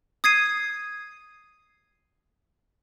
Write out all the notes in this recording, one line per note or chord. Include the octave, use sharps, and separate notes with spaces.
D#6 G#6 C7 D#7